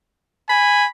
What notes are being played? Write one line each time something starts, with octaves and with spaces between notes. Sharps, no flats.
G#5 B5